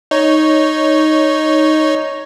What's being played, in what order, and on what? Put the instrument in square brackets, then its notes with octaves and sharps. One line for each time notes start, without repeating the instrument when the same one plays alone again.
[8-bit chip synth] D#4 C#5